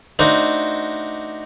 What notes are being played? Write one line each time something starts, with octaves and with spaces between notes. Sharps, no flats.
A3 D4 D#4 F#4 C5